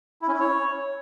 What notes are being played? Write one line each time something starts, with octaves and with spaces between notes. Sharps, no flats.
E4
C#4
E4
C#5